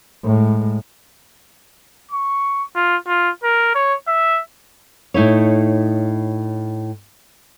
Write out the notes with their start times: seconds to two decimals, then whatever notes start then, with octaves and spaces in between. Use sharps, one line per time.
0.25 A2 G#3
2.11 C#6
2.75 F4
3.07 F4
3.44 A#4
3.75 C#5
4.08 E5
5.14 A2 D#4 E4 C#5